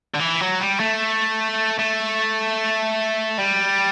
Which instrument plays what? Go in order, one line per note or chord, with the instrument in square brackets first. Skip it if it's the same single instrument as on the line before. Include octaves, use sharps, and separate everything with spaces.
[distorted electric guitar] D3
E3
F#3
G3
A3
A3
G3